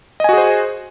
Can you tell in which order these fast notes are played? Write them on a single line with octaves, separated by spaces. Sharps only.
D#5 G#5 F#4 G#4 C5